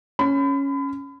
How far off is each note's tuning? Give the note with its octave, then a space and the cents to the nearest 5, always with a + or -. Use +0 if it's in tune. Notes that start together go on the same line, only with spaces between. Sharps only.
C#4 +0 B5 +35